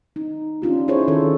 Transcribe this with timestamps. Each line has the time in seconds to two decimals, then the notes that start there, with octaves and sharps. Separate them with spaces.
0.16 D#4
0.62 C#4 D4 F4 G4
0.88 D#4 E4 G#4 C5 C#5
1.08 D#3 C#4 A4 C5